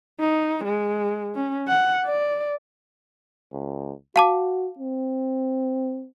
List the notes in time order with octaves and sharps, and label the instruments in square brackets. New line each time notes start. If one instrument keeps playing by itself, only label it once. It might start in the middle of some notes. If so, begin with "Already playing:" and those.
[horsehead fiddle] D#4
G#3
C#4
F#5
D5
[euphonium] C#2
[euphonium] F#4 [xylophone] F5 A5 D6
[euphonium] C4